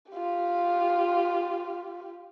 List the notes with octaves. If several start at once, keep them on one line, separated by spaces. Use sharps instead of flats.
F4 G4